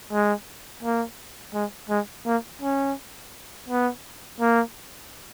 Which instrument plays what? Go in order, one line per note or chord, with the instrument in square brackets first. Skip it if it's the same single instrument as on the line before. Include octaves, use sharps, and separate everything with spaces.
[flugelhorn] G#3
A#3
G#3
G#3
A#3
C#4
B3
A#3